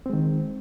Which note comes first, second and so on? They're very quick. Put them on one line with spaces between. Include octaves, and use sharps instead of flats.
C4 G#3 D#3